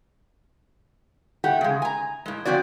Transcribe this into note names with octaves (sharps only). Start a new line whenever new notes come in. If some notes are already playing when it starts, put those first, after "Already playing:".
A3 G4 F#5
C#3 G#3
G#5 A#5
A2 G#3
F3 C4 C#4 F#4 D5